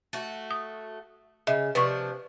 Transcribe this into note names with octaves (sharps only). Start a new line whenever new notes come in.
A3 F#4
D#6
C#3 D#5 E5
C3 F3 D4 B4 C#6